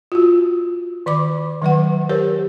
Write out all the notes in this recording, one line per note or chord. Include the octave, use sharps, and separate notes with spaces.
F4 F#4
D#3 D5 B5 D6
D#3 F#3 B4 F#5
G4 A#4 C5 C#5